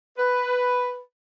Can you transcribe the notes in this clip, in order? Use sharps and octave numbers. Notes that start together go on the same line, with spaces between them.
B4